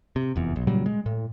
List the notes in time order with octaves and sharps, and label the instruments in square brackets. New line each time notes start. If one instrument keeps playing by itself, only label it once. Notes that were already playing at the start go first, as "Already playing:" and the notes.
[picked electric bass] C3
F1 E2
B1
A#2 C#3 F#3 G3
G#3
A2